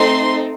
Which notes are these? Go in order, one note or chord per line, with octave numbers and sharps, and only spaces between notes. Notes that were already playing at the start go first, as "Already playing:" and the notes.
Already playing: A3 C4 D#4 A4 C6